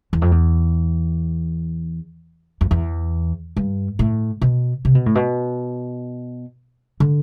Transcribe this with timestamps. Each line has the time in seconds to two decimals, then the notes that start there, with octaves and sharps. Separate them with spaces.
0.13 E2
0.22 F2
0.31 E2
2.61 F2
2.71 E2
3.57 G2
3.99 A2
4.42 B2
4.85 C3
4.95 B2
5.06 A2
5.15 B2
7.00 D3